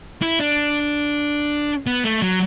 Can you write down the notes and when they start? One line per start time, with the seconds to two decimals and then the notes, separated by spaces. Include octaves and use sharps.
0.22 E4
0.40 D4
1.87 B3
2.04 A3
2.22 F#3